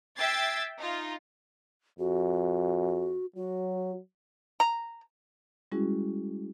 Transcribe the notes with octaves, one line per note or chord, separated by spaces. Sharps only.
E5 G5 E6 G#6 A6 C7
D#4 F4
F2 F#4
F#3 F#4
A#5
G3 G#3 C#4 E4 F#4 G#4